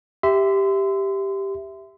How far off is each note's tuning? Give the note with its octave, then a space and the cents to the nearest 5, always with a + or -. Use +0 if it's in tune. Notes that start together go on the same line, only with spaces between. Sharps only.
G4 +0 E5 +0 C6 -30